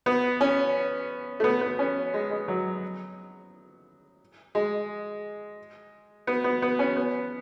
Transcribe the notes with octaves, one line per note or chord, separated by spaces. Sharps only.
B3
C#4
A3
B3
B3
C#4
G#3
G#3
F#3
G#3
B3
B3
B3
C#4
B3